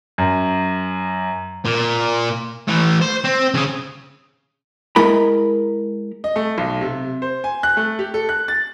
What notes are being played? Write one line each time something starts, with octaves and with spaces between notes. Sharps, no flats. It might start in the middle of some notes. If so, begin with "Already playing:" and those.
F#2
A#2
E3 A3
C5
C4
C#3 G#4
G#3 E4 A#4 B5
D#5
A3
B1
C3
C5
G#5
F#6
A3
G4
A4
F#6
A6